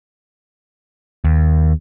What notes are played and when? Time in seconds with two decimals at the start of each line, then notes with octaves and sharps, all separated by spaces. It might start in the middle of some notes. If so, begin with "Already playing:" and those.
1.24 D#2